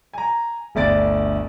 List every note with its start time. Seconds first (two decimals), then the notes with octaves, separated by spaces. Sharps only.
0.13 G#5 A#5
0.75 G1 D2 D5 A6 D7